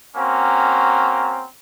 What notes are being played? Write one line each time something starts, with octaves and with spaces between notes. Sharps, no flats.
A#3 C4 C#4 F#4 A#5